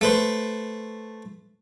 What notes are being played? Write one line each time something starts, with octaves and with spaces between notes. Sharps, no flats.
A3 B4 C5